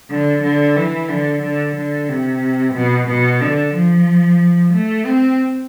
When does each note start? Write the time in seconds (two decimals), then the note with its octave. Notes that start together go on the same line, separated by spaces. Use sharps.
0.10 D3
0.43 D3
0.76 E3
1.09 D3
1.43 D3
1.76 D3
2.09 C3
2.75 B2
3.08 B2
3.41 D3
3.74 F3
4.73 A3
5.06 C4